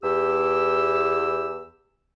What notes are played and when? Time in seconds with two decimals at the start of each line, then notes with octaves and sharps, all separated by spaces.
0.03 E2 G4 E6